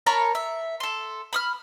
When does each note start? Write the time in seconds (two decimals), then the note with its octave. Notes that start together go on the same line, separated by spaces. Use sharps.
0.06 A#4 C#5 A5 B5
0.35 E5
0.80 A4 C6
1.33 B5 D#6 F6